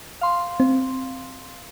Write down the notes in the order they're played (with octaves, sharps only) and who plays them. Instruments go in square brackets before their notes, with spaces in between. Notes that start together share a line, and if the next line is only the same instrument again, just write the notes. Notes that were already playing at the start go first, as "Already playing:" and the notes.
[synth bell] F5 C6
[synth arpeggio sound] C4